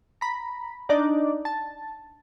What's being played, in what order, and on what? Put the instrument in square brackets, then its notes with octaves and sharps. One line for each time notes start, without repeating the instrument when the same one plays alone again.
[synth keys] A#5 B5
D4 D#4 D5
A5